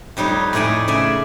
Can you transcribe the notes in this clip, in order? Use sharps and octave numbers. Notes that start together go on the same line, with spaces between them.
F2 G3 D#4 C#5
A2 A3 D#4 D5 G#5
C#3 D5 E5 G#5